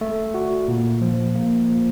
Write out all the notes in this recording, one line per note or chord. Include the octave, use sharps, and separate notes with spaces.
A3
F#4
A#2
F3
A#3
F3